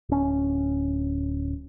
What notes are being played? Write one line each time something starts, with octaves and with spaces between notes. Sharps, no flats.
D1 C#4